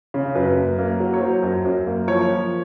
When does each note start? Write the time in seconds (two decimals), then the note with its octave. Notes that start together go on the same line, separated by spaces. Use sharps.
0.14 C#3
0.35 F#2 B4
0.57 A#3
0.79 A#3
1.00 F#3
1.14 C#5
1.21 F#3 C5
1.43 F#2
1.65 F#2
1.86 A#3
2.07 F3 C#5
2.29 F3